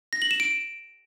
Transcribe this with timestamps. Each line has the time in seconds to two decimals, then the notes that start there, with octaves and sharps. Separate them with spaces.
0.13 A#6
0.22 F#7
0.31 E7
0.40 D7